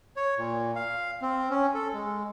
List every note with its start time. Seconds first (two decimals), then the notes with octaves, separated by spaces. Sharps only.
0.16 C#5
0.38 A#2
0.76 F5
1.22 C4
1.50 C#4
1.74 A4
1.94 G#3